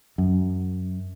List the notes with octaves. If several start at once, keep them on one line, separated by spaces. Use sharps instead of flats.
F#2